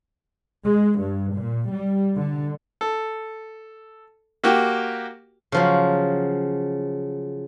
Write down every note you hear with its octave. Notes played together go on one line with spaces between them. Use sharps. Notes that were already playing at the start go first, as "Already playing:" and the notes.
G#3
G2
A#2
G3
D3
A4
A#3 F#4 G4
C#3 F3 F#3